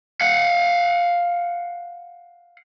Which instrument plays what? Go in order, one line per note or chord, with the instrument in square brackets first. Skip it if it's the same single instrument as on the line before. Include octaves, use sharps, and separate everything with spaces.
[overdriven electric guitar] F5 F#5